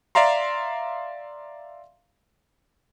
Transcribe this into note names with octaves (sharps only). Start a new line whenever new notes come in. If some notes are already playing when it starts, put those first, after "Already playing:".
D5 E5 F5 A#5 C6